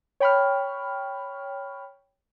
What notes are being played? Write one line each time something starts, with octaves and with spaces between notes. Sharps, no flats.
C#5 G5 B5 C#6 F6